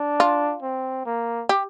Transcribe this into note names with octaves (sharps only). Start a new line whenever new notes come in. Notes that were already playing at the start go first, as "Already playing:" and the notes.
Already playing: D4
F4
C4
A#3
G4